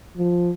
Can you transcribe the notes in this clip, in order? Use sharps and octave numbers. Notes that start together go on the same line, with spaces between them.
F3